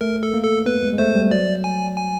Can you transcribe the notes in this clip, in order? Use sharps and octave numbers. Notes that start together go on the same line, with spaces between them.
A3 A#4
A4
A#3
A4
B3 B4
G#3
G#3
A3 C5
G3
F#3 D5
G#5
G#5